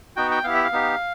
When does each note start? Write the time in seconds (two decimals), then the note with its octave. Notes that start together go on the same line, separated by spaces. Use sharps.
0.16 B3 D#4 F#4 G5
0.31 G5
0.44 B3 E4 G4 F5
0.54 E5
0.64 F5
0.72 B3 D#4 G4